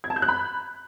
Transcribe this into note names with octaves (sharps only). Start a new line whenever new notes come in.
G#6
A5
G6
F#6
B5